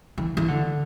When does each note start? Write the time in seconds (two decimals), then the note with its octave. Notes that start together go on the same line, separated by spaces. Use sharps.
0.18 E3
0.37 E3
0.48 D3